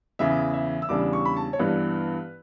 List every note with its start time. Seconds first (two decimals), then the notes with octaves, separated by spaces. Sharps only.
0.19 E2 C#3 E3 E5
0.54 E5
0.82 E6
0.89 E2 C#3 G3 D4 D6
1.13 C#6
1.26 B5
1.37 A5
1.53 C#5
1.59 G2 E3 B3 D4 B4